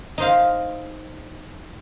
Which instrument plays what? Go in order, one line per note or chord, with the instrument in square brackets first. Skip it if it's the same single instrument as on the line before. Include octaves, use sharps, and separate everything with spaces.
[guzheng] D#4 C5 F5